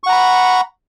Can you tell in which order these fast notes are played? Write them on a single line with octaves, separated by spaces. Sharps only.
C#6 F#5 A#5 B5